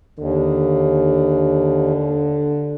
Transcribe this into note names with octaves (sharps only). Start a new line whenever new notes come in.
D#2 D3